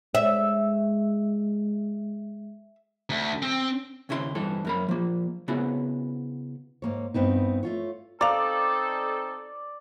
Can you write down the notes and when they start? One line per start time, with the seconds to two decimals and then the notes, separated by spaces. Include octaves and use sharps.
0.15 G#3 E5
3.10 D2
3.42 C4
4.09 D#2 C#3 E4 G#4 C6
4.35 G2 E3 A4
4.65 F#2 A#3 B5
4.89 F3 A#3
5.48 C#3 B3 E4 F#4
6.82 G#2 A#3 C#5
7.14 G2 B3 C4 D#4
7.63 A3 F4 C#5
8.21 C4 D#4 A4 D5 F5 A#5